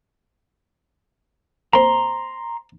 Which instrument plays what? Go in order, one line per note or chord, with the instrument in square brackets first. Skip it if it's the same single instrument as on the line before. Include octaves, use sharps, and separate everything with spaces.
[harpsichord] A#3 C4 [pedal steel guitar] A#5 C6